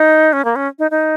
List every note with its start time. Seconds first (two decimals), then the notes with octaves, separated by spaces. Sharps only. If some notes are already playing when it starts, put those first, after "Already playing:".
Already playing: D#4
0.33 C#4
0.45 A#3
0.56 C#4
0.79 D#4
0.91 D#4